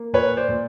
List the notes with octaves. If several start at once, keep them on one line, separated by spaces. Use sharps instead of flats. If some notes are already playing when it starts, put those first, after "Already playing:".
Already playing: A#3
A#2 B4 C#5
C5 D5
A#2